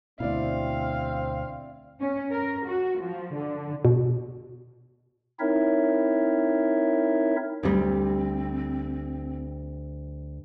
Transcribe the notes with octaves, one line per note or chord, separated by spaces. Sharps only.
D2 B2 C4 E4 D5 F5
C#4
A#4
F#4
F3
D3
B2
C4 D#4 E4 A#4 C#5 E5
D2 G3 C4